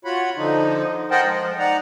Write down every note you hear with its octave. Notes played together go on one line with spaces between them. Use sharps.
F4 F#4 C#5 F#5 B5
D3 F3 D#4
A#4 C5 D#5 F#5 G5 A5
F3 G#3
D#4 D5 F#5 A#5